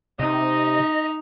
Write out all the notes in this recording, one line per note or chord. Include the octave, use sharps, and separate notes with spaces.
C3 D#4 D#5